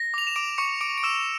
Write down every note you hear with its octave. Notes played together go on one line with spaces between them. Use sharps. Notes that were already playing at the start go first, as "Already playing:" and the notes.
Already playing: A#6
D6 F7
E7
D6 D7
C#6 D6 C#7
D6 D7
D7
D6 E6 E7